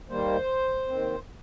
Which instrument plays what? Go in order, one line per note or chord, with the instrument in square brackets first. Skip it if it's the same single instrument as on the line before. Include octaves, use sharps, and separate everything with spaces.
[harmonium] D#2 D#3 G3 A#3 C5
D#2 D#3 C4